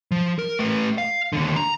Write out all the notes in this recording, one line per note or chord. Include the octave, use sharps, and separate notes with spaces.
F3
A#4
A3 B4
F5
D#2 D3
A#5